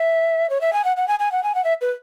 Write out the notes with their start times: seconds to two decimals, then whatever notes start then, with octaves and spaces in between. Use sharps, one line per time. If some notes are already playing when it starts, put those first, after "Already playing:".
Already playing: E5
0.50 C#5
0.61 E5
0.73 G#5
0.84 F#5
0.97 F#5
1.08 G#5
1.19 G#5
1.32 F#5
1.43 G#5
1.55 F#5
1.64 E5
1.81 B4